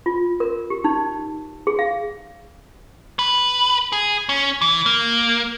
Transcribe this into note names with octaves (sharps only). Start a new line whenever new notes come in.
F4
A#4
G4
D#4
G#4
F5
B4
G#4
C#4
E3
A#3